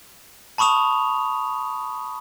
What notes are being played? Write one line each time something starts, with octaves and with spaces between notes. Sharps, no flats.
A5 B5 C#6 D#6 F7